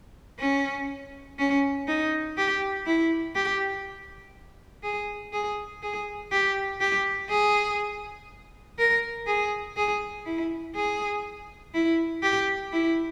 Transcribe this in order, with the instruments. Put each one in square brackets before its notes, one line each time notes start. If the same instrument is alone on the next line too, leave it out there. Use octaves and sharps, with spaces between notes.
[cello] C#4
C#4
D#4
G4
E4
G4
G#4
G#4
G#4
G4
G4
G#4
A#4
G#4
G#4
E4
G#4
E4
G4
E4